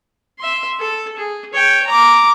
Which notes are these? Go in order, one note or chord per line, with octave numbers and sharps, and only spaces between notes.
E5 C6
A4
G#4
C#5 G5
A#5 D6